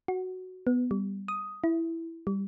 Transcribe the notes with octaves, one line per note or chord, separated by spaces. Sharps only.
F#4
B3
G3
D#6
E4
G3